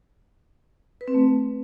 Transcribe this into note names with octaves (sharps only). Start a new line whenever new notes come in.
B4
C4
A3